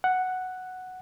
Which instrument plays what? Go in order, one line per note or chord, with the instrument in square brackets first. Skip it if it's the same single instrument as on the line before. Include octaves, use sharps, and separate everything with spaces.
[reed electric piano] F#5